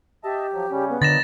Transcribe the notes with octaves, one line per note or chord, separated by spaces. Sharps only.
G4 D#5 E5 A5
F3 F#3
C#3 G3 C#4
B3
A#2 D3 F#3 D#5 A6 A#6 E7